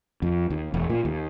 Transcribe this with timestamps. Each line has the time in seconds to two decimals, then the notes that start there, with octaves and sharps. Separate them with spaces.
0.22 F2
0.50 D#2
0.74 E1
0.90 A#2
1.05 D#2